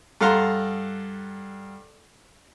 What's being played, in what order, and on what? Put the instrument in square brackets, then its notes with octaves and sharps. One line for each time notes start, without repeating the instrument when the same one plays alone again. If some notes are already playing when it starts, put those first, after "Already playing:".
[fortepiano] G2 A4 F5 F#5 A#5 C6